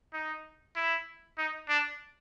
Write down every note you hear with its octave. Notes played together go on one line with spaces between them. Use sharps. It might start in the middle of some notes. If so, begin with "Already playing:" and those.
D#4
E4
D#4
D4